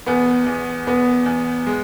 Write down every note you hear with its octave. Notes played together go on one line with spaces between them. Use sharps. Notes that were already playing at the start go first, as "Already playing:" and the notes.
E2 B3
E2
E2 B3
E2
G#3